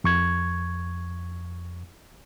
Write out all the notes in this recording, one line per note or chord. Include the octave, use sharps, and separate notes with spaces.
F2 C#6 G#6